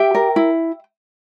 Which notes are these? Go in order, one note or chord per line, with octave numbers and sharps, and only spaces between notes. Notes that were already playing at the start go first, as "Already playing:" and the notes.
Already playing: G4 E5 G5
A#4
E4